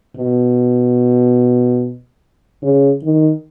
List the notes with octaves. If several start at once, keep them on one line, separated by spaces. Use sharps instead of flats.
B2
C#3
D#3